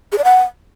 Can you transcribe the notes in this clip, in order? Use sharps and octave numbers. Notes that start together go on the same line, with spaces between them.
G#4
D5
F#5